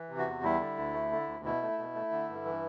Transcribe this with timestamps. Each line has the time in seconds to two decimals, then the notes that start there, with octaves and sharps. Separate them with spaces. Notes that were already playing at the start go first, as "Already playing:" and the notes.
Already playing: E3
0.09 C3
0.18 F#4
0.27 E2
0.43 G3 E4
0.60 D3
0.78 D2
0.94 A3
1.12 D3
1.27 D2
1.45 B2 E4
1.62 A3
1.78 B2
1.95 A3
2.12 D3
2.29 G2
2.45 E3